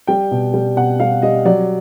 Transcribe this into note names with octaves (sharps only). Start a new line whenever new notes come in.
G3 G5
B2
G3
B2 F#5
G3 F5
G3 D#5
F#3 D5